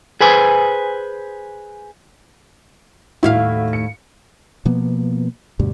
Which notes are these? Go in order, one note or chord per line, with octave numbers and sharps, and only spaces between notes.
G#4 B4 C5 G#5
D#2 A2 E4 F#4 F5
C#7
B2 F3 A#3 B3
D2 G2 B2 G3